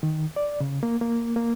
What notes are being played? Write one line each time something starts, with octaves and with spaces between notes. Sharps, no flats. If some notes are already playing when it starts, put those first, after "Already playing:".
D#3
D5
C#3
A#3
A#3
A#3